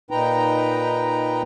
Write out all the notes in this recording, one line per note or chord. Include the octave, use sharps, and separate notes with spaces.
A#2 D#4 B4 G5 A#5